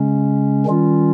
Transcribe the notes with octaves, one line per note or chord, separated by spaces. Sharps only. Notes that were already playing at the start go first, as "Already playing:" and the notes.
Already playing: C#3 G#3 C#4
D#3 G3 C#4 F4